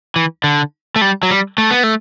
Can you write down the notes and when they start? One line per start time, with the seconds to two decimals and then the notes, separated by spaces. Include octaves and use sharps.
0.16 E3
0.44 D3
0.96 A3
1.01 G3
1.23 F#3
1.30 G3
1.58 A3
1.71 B3
1.84 A3